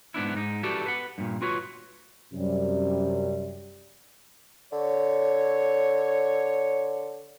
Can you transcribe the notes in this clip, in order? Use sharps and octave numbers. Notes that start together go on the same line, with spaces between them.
G#2 B3 D4 E4
G#2 D#4
E4 F#4 G4 A4 B4 D5
B4 F#5
G2 A#2
F4 F#4 B4 C#5
F#2 C3 G3
D3 C#5